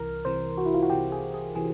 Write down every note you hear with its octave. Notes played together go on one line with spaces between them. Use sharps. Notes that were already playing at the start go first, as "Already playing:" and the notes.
Already playing: C2 C3 E3 A#4
C2 C3 E3 C5
F#4
E4
F4
F#4
C2 C3 E3 G4
G#4
G#4
C3 E3 G#4